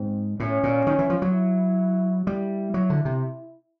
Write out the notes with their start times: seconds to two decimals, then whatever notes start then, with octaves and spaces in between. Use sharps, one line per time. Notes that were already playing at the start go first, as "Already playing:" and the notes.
Already playing: G#2 C4
0.39 A2 C#4
0.63 A#2
0.87 D#3
0.99 E3
1.10 F3
1.22 F#3
1.33 E4
2.27 G3 E4
2.74 F#3
2.90 D3
3.05 C3